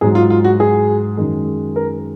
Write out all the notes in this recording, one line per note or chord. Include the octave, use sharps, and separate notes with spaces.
G#2 F#3 G#4
F4
F4
F#4
G#4
F#2 D#3 G#3
A#4